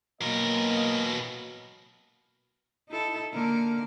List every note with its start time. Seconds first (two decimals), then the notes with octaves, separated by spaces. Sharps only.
0.22 B2 F#3 A#3 A#4 D#5
2.89 D#4 E4 A4
3.33 D3 A#3 A#4